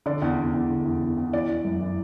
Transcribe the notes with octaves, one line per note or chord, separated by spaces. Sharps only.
D3 D5
E2
E2
E2
D3
E2
E2
E2
E3 D5
E3
F#2
E3